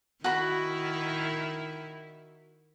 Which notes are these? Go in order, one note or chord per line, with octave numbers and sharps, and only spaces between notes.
D#3 E4 F#4 B5